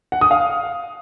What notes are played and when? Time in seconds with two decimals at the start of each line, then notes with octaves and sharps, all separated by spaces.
0.12 F#5
0.21 D#6
0.31 F5